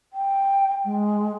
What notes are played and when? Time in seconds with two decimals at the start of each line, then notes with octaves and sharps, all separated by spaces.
0.13 G5
0.85 G#3